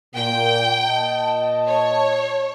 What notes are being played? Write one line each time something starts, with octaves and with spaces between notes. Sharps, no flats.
A#2 G5
A#2 D#5 A5
C#5